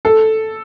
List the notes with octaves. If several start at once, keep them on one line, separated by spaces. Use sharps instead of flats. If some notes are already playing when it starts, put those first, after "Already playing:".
A4